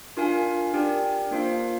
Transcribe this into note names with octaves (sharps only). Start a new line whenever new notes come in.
D4 F4 A#4 F5 G#5
D4 G4 A#4 D5 G5
A#3 D4 F4 C5 F5